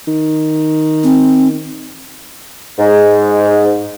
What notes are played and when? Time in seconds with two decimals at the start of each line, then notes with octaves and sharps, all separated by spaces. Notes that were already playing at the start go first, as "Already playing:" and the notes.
0.08 D#3
1.04 C4
2.79 G#2